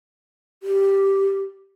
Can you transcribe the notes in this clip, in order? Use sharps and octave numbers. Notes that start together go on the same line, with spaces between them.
G4